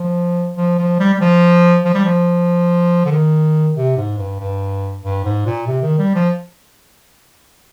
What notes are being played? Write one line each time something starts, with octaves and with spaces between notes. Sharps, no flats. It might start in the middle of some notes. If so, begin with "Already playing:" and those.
Already playing: F3
F3
F3
G3
G3
F3
F3
G3
F3
D3
D#3
C3
G#2
G2
G2
G2
G#2
A#2
C3
D#3
G3
F3